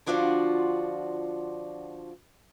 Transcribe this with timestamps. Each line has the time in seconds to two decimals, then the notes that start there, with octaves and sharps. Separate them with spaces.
0.06 D3 F3 D4 F4 F#4 D5